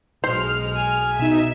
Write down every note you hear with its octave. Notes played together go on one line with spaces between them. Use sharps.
B1 G#3 C5 F6
G#5
B2 D#4 E5